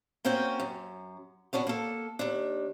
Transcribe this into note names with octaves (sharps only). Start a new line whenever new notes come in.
A#3 C4 C#4 F#4 G5
F#2
B3 C#4 D4 F#4
A#3 A4
D#2 D4